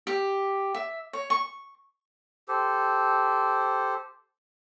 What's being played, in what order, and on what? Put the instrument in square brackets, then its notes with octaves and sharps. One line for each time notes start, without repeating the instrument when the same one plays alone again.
[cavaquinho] G4
E5
C#5
C#6
[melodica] G4 A4 C5